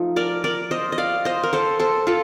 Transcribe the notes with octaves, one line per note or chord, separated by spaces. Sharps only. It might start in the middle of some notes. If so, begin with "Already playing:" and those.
Already playing: F3 A3 D#4
A#4 D5
A#4 D5
C5 D#5
D#5
D5 F5
C5 D#5
A#4
A4 C5
A4 C5
F4 A4